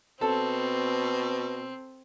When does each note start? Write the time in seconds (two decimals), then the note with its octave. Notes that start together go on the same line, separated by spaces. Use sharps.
0.21 B2 C4 A4